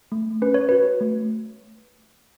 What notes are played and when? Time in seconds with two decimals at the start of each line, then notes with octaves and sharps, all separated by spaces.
0.12 A3
0.42 C#4 B4
0.54 C#5
0.69 F#4 B4
1.01 A3